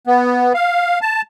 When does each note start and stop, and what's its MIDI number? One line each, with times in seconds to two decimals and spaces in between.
0.07 0.53 59
0.54 0.99 77
1.02 1.22 81